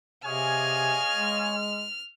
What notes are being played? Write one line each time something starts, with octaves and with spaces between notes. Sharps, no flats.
C3 G#4 C#5 D#5 F5 G#5 F6
G#3